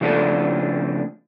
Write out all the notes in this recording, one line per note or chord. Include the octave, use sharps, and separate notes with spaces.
C#3 F3 A3 D4 A4